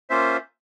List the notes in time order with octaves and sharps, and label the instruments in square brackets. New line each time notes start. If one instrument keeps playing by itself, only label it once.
[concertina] A#3 C#4 F4 C5 E5